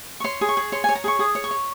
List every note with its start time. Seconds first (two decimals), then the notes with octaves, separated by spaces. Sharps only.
0.20 C#6
0.24 C#5 C6
0.41 G#4
0.49 C#6
0.57 G#4
0.72 C#5 C6
0.84 C#5 G#5
0.95 A#5
1.04 G#4 C#6
1.19 G#4 D#6
1.35 C#5
1.44 C#6
1.51 C#5